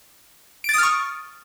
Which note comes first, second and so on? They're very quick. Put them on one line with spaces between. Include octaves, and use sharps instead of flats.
D7 A6 D#6 F6 C#6